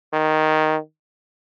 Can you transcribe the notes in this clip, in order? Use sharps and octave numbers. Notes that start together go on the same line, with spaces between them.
D#3